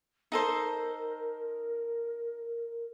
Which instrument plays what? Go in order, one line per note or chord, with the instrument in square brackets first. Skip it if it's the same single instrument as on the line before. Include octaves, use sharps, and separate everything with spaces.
[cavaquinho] D#4 A4 C5 [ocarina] A#4